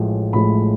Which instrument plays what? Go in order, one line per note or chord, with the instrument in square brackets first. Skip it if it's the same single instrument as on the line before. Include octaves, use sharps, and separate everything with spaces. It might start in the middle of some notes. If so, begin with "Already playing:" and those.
Already playing: [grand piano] A1 A2 F3 G#3
A1 A2 F3 G#3 B5